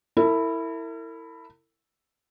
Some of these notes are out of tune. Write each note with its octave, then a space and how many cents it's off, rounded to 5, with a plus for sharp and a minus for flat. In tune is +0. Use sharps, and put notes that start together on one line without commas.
E4 +0 A#4 -45